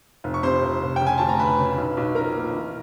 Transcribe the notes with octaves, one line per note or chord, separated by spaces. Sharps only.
F1
C#6
C3 C5 C6
F1
F1
C#3 G5
G#5
D2 A5
A#5
D2 B4 B5
C#3
B1
B1
F3 A#4 A#5
A#2
E3